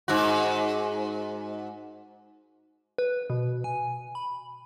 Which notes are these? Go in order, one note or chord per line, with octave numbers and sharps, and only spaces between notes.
G#2 F#4
B4
B2
G#5
B5